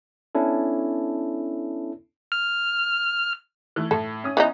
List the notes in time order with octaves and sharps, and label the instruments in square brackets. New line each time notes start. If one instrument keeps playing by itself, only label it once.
[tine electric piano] B3 C#4 D4 E4 A4
[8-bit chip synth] F6
[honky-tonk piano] E3 A3
[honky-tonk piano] A2 [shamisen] A4
[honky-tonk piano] C#4 D#6
[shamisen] E3 B3 D#4